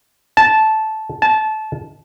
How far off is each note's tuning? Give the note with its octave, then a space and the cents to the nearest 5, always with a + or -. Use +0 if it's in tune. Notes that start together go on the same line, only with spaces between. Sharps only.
A5 -10
A5 -20